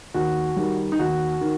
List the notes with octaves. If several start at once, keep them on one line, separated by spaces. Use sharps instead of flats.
D#2 F#4
D#3 G3
D#4
D#2 F#4
D#3